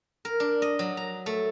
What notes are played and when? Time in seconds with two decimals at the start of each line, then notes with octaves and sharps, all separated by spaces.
0.25 A#4
0.40 D4
0.62 D#5
0.79 F#3
0.97 A#5
1.26 A3